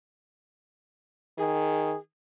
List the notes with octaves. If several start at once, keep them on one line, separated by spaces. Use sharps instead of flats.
D#3 G#4